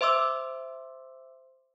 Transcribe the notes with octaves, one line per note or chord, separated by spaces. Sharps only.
C5 E5 C6 D6 E6